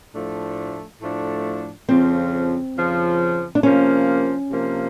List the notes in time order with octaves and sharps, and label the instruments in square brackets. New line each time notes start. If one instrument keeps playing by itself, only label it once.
[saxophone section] A2 F3 A3 D4
A2 F3 A3 D4
[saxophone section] F2 C#3 F3 [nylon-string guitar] C4
[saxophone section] F2 C#3 F3
[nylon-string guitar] D4
[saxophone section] C3 F3 A#3 [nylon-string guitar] C#4
[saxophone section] C3 F3 A#3